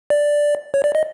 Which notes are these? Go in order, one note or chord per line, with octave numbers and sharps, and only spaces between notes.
D5
C#5
D5
D#5